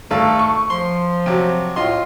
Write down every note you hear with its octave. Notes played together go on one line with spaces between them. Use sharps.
G#1 A3 A4 F5
C#6
F3 C6
C3 F#3
A2 F4 D#5 C6